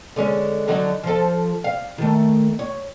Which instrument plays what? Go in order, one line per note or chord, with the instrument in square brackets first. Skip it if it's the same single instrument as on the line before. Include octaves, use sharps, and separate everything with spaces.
[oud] D3 G#3 C#4
D3 F#3 D#4
F3 A4
F5
D#3 A3
C#5